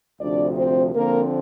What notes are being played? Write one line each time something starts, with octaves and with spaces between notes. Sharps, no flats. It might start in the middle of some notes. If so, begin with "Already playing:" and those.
D2 C3 F3 D4 D5
C4 C5
D3 F3 A#3 C4 A#4